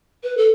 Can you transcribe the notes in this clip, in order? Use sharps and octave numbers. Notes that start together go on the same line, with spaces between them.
B4
A4